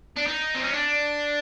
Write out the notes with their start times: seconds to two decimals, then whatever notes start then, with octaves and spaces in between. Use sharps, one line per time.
0.16 D4
0.27 D#4
0.55 C4
0.63 C#4
0.73 D4